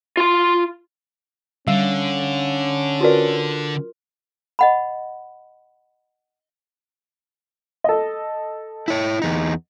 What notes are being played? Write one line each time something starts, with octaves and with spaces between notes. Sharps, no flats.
F4 C6
D3 G3 C#4 F5
F4 F#4 A#4 B4 D5
D#5 F#5 B5
A4 D#5
E4 C#5
E2 D#4